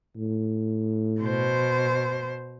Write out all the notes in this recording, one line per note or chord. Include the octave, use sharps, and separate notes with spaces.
A2
B2 C5